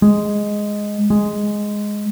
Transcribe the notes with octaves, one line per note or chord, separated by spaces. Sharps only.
G#3
G#3